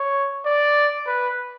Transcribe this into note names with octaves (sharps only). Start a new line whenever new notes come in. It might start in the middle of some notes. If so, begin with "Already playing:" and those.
Already playing: C#5
D5
B4